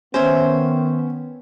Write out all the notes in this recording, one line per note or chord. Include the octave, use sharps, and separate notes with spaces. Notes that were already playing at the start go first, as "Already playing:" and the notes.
D#3 B3 C#4 C5 C#5 E5